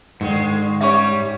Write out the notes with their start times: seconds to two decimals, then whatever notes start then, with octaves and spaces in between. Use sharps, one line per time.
0.21 G#2 D3 D#3 G#3
0.81 G3 C#4 G4 C#5 E5 C#6 D6